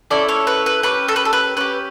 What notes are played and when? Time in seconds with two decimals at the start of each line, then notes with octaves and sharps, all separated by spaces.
0.11 C#4 E4 A4 D5
0.29 C#5
0.47 B4
0.66 B4
0.83 C#4 G4 B4
1.08 A4
1.16 B4
1.25 A4
1.33 B4
1.57 C#4 G4 B4